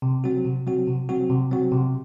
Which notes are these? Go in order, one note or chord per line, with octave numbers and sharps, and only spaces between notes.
C3
F#3 C4 F#4
C3
F#3 C4 F#4
C3
F#3 C4 F#4
C3
F#3 C4 F#4
C3